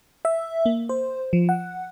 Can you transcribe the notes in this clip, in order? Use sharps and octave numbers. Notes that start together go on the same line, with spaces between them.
E5
A#3
C5
F3
F#5